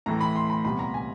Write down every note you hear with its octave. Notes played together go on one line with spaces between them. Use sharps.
A2 E3 A3 A#5
B5
C6
B5
C2 A#2 G3 B3 B5
A#5
G#5